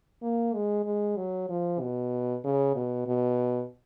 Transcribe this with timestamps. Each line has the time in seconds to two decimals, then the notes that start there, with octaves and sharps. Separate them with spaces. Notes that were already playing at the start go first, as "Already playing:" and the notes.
0.22 A#3
0.54 G#3
0.85 G#3
1.17 F#3
1.49 F3
1.81 B2
2.44 C#3
2.76 B2
3.07 B2